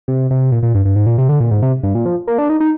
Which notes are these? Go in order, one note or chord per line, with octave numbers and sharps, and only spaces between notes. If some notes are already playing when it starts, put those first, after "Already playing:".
C3
C3
A#2
A#2
G2
G2
G#2
A#2
C3
D3
A#2
G#2
C3
G2
A#2
F3
A#3
D4
D#4
D#4